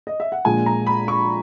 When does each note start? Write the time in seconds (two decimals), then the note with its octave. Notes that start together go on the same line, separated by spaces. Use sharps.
0.07 D#5
0.20 E5
0.32 F#5
0.45 A#1 A#2 G#3 G#5
0.66 A#5
0.87 B5
1.08 C#6